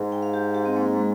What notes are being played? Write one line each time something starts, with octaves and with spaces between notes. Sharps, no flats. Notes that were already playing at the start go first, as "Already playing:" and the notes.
Already playing: G#2
G5
F5
G4
G4
C4
A#3
G#3